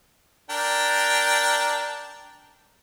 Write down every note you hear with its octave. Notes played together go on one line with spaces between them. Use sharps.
D4 A#4 G5